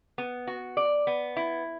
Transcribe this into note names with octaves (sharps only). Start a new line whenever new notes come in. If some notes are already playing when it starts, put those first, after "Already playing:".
B3
F#4
D5
B3
E4